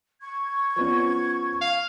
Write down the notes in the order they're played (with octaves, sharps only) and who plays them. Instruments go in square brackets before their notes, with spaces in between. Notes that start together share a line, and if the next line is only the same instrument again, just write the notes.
[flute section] C#6 G#6
[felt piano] F3 B3 C#4
[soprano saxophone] F5